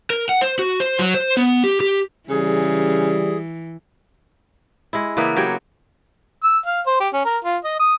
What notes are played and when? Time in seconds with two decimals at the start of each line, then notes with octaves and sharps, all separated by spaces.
0.10 A#4
0.29 F#5
0.41 C5
0.59 F#4
0.80 C5
0.99 F#3
1.14 C5
1.37 B3
1.64 G4
1.81 G4
2.29 C#3 E3 G3 G#4
4.93 G#3 E4
5.17 C#3 E3 A#3 B3
5.36 F#3 G4 C#5 G5
6.44 E6
6.66 F5
6.86 C5
7.00 G4
7.14 C#4
7.25 A#4
7.44 F4
7.64 D#5
7.79 D#6